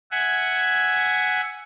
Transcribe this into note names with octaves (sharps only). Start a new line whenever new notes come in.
E5 F#5 G#5